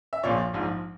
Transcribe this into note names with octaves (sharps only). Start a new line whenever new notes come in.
E5
A#1 A#2 F3 C#5
A#1 G#2 F3